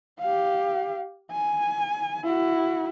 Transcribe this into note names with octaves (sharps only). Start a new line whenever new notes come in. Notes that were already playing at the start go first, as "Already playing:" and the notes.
G4 F5
G#5
E4 F#4